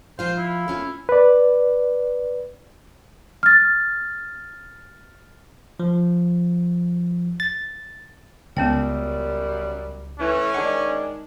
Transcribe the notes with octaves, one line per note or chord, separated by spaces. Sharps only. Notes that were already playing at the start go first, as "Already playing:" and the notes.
F3 F4 C5 F5
E4
A3 C#4 F4
B4 D5
F6 A6
F3
A6
C#2 F#2 G3 B3 C#4 G5
E3 A3 C#4
D#3 G#3 D4 F#5